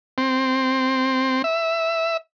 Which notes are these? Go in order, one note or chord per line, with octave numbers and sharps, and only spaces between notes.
C4
E5